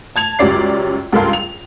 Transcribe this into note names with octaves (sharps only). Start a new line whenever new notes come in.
A5 G#6 F7
C#2 F#2 G3 C#4 D5 C7
C#2 G2 A4 A#4 F5 C6
F7